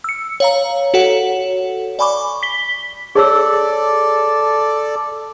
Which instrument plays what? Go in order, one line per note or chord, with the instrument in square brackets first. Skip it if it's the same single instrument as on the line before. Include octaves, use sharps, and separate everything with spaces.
[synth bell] E6 C#7
C#5 F5 A#5
F#4 A4 C#5 F#5
D5 G#5 B5 C#6 D6
B6 G7
[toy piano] G#4 C#5 E6 [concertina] A4 D5